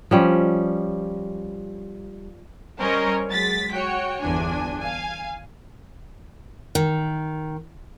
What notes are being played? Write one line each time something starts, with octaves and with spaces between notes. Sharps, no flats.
F3 G3 C#4
G3 C#4 A#4 C5 C#5 D#5
F#3 G#3 A6 B6
F#4 C#5 G5
G1 E2 D4 G#5
F5 G#5
D#3